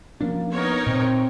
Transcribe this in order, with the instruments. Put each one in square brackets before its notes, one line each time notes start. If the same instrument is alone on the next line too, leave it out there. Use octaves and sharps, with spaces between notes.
[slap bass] F3 C#4 D4 [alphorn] A#3
[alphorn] B3 [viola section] D#4 A#4 C#5
[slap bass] A#2 [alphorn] C4